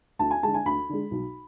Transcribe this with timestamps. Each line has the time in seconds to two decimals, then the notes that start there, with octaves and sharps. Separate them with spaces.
0.19 D2 A5
0.31 G#5
0.43 D3 G#3 A5
0.54 G#5
0.65 D2 B5
0.89 D3 G#3
1.11 B1